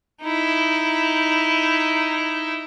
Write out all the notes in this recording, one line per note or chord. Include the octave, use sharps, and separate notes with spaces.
D#4 E4